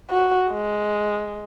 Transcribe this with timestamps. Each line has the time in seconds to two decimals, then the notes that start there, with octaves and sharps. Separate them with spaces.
0.10 F#4
0.50 G#3